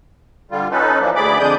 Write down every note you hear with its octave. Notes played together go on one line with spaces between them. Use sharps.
D3 G3 F4
C#4 D#4 A4 B4
E3 F3 A#3 D4
D2 G#4 D5 B5 D6
F2 D3 G#3 D4 D#6 G6